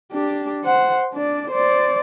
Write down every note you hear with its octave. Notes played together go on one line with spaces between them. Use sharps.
D4 G4
C5 F#5
D4 D5
C5 D5